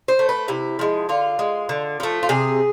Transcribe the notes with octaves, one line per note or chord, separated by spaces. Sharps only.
C5
A3
B4
C3 E4
F3 G#3
D3 F4
G#3
D3
F3 A3
F4
C3 G#4